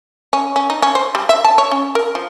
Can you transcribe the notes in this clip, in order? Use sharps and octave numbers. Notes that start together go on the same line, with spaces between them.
C#4
C#4
D#4
C#4
C5
G3
E5
A5
C#5
C#4
A#4
F3